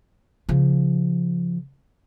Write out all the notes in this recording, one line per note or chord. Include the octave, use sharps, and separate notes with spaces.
C#3 F3